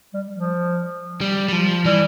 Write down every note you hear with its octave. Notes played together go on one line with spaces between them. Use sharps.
G3
F3
G3
G3
F3
E3 G3